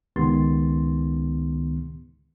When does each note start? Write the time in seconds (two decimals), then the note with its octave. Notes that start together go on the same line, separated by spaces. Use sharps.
0.16 C#2 D#3 B3 G4 C6 A6